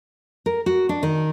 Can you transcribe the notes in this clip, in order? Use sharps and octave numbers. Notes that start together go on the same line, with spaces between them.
A#4
F#4
D4
D#3